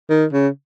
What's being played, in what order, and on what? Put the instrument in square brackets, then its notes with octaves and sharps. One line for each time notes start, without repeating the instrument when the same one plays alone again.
[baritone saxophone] D#3
C#3